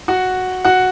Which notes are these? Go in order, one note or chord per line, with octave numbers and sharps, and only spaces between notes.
F#4 F#5
F#4 F#5